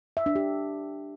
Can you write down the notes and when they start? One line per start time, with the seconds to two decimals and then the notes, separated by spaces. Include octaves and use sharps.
0.17 E5
0.26 D4
0.35 G4